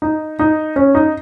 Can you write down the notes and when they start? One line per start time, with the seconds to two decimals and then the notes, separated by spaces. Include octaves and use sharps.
0.02 D#4
0.39 D#4
0.76 C#4
0.95 D#4